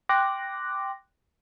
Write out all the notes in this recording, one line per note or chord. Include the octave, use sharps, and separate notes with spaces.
G5 C6 D6 F#6 A#6